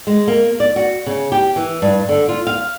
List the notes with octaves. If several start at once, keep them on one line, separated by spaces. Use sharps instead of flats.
G#3
A#3
D5
F#4
C#3
G4
E3
G2
D3
F4
F5